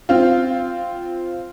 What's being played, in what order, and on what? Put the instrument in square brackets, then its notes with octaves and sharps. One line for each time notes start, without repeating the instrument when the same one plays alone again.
[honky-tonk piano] C4 F4